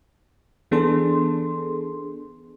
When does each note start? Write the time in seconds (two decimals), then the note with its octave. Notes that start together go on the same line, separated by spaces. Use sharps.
0.71 E3 B3 D4 G#4 A4 C6